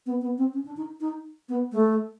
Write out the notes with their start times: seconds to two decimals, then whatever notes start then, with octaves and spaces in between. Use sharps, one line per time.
0.06 B3
0.21 B3
0.38 C4
0.53 C#4
0.65 D4
0.77 D#4
1.00 D#4
1.49 B3
1.72 A3